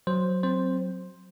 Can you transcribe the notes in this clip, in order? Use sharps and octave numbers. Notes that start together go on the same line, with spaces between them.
F#3 C5
C4 C5